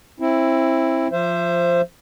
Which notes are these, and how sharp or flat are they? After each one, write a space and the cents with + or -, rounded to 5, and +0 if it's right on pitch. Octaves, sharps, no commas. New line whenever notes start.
C4 +30 E4 +0
F3 +0 C5 +0 E5 +35